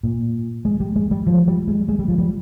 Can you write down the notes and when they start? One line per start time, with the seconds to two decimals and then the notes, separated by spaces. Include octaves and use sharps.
0.03 A#2
0.65 G#3
0.80 G3
0.96 G#3
1.11 G3
1.27 F3
1.47 G3
1.67 G#3
1.88 G#3
1.99 G3
2.08 F3
2.18 G3